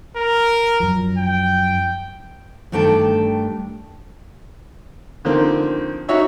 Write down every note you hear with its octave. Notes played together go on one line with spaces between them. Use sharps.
A#4
F#2 F3
G5
G2 D#3 A3 D4 G5 A5
D3 D#3 F3 A#3 C4
D#4 F#4 C#5 E5 C#6